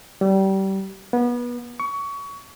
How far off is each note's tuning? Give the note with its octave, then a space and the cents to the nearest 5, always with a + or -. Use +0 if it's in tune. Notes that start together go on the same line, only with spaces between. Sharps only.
G3 -25
B3 -30
C#6 +25